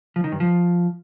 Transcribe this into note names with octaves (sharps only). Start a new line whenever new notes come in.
F3
D#3
G2
F3